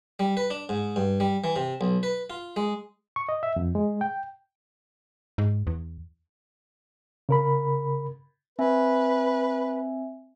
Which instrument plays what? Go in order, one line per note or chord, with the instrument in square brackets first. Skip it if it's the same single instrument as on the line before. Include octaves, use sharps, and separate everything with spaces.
[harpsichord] G3
B4
D4
G#2
G2
G3
E3
C3
B1
B4
F4
G#3
[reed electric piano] C#6
D#5
E5
F2
G#3
G5
[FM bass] G#2
E2
[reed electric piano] C#3 A#4 B5
[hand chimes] C4 E5 G#5 [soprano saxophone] B4